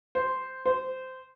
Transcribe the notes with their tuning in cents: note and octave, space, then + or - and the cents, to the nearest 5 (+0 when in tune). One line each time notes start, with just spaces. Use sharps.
C5 -5
C5 -15